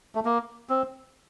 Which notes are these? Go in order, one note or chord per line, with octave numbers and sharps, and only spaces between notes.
A3
A#3
C4